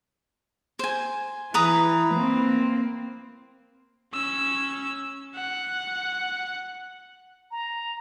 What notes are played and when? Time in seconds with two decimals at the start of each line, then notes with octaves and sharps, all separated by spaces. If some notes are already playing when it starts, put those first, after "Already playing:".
0.79 C5 G#5
1.54 E3 B4 A#5 D#6
2.15 A#3 C4
4.13 C#4 E6
5.36 F#5
7.51 A#5